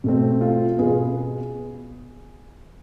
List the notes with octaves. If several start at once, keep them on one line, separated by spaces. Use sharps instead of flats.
B2 A3 C4
F4
B2 B3 G#4